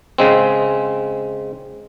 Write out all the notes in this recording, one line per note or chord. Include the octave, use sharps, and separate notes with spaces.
C#3 G#3 C4